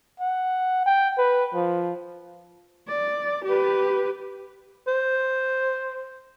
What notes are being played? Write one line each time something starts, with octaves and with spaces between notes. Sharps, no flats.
F#5
G5
B4
F3
D5
G4 B4
C5